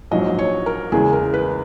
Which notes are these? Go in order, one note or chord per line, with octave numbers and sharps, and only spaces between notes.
A#1 G#2 F#3 D#5
C#5
A#4
E2 C#3 G#3 G#4
A#4
B4